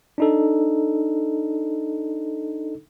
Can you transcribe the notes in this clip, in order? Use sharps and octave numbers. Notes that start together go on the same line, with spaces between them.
D4 D#4 A4